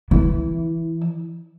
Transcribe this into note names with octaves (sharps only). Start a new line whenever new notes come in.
E3